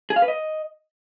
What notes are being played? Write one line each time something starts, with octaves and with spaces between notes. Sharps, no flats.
G#4
F5
B4
D#5